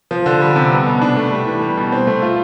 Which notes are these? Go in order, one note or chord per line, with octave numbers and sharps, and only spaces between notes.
F3
D3
G3
C3
B3
B2
D4
A3
G3
E3
G3
B2
C4
A3
F4